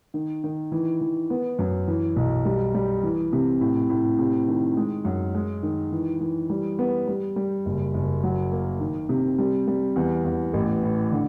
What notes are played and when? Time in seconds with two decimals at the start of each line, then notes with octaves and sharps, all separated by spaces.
0.14 D#3
0.44 D#3
0.72 E3
1.01 E3
1.30 B3
1.59 F#2
1.88 E3
2.16 B1
2.45 G3
2.74 G3
3.03 E3
3.33 C3
3.61 A2
3.90 A2
4.18 C3
4.48 D#3
4.77 G#3
5.05 F#2
5.34 G#3
5.63 D#3
5.92 E3
6.21 E3
6.50 G3
6.79 B3
7.07 G3
7.36 G3
7.66 F#1
7.94 F#1
8.23 F#3
8.52 A#3
8.80 D#3
9.09 C3
9.38 G3
9.67 G3
9.96 E2
10.25 E2
10.54 A1
10.83 A2
11.12 D3